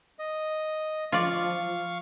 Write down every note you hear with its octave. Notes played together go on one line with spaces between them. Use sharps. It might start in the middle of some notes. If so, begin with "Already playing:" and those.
D#5
F3 F4 D5 F5 C#6